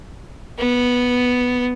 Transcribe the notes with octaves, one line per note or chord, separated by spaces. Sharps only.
B3